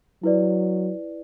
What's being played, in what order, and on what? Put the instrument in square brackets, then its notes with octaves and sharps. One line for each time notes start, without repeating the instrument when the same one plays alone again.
[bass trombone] F#3 [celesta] E4 B4 D5